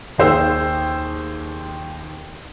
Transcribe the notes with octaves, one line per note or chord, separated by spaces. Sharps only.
D#2 G#4 C5 G5 E6